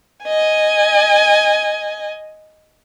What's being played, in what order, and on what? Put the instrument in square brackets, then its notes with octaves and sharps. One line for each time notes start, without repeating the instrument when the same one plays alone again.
[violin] D#5 G#5